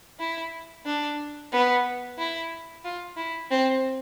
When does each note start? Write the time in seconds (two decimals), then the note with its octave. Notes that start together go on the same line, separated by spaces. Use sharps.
0.20 E4
0.86 D4
1.52 B3
2.18 E4
2.84 F4
3.17 E4
3.51 C4